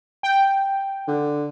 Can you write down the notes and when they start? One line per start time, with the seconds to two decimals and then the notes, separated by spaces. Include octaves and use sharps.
0.23 G5
1.07 D3